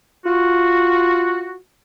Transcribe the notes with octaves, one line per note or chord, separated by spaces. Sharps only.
F4 F#4